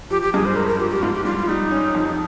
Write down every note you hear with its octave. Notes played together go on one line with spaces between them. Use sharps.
F3 G4
G4
G2 G#4
C5
G#3 A#4
A#4
F3 G4
G4
G#2 F4
G4
G3 F4
F4
G3 D#4
C#4
F2